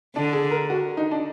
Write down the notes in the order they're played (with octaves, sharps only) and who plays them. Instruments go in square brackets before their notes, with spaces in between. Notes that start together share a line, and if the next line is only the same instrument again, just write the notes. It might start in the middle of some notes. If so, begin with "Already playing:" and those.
[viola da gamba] D3 [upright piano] D4
[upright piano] G#4
A#4
F#4
D#4
D4